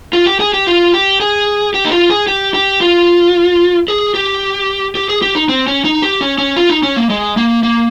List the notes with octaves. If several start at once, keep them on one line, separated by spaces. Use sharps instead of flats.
F4
G4
G#4
G4
F4
G4
G#4
G4
D#4
F4
G#4
G4
G4
F4
G#4
G4
G4
G#4
G4
D#4
C4
C#4
D#4
G4
C#4
C#4
F4
D#4
C#4
A#3
G#3
A#3
A#3